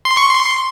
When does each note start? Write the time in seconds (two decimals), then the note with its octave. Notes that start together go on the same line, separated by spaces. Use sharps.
0.05 C6
0.17 C#6
0.29 C6